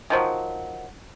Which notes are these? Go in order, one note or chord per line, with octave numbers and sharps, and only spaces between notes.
D#3 F3 F#3